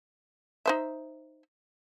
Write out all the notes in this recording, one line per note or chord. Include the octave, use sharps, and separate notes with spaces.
D#4 C5 E5